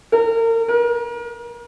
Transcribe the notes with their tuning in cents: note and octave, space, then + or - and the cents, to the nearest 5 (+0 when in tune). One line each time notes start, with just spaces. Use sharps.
A#4 -35
A#4 +35